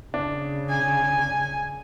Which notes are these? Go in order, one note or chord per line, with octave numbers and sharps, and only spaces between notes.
C#3 D4
G#5